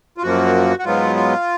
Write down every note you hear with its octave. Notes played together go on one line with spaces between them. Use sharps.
F4
F#2 F3 A#3 F#4
F#4
G#2 F#3 B3 F4
F4